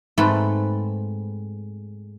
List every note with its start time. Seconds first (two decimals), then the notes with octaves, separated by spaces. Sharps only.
0.18 G#2 A3 C4 B4 A5 B5